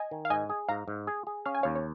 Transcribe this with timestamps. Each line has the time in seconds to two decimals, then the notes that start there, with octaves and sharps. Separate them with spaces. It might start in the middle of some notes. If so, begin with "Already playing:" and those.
Already playing: D#5 G#5
0.11 D#3
0.25 F5
0.30 G#2 D#5 G#5
0.50 G#4
0.68 G#2 F5 A#5
0.88 G#2
1.07 G#4
1.27 G#4
1.45 C#4 F5
1.55 G#5
1.63 D#2 C#5 F5
1.75 C#5